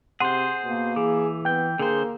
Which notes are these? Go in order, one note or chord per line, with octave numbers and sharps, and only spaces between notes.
C3 G#4 C5 F#5 C6
B2 A#3
E3 G#4 D6
B3 G5 G6
D3 A#3 G#4 C5